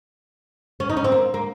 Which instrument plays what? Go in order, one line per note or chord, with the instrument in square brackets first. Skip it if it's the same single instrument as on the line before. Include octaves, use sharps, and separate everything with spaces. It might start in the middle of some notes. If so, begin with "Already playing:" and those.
[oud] C#4
D#4
C#4
C4
A#3
A#3